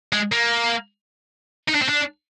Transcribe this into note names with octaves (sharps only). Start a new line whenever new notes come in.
G#3
A#3
D#4
D4
C4
D4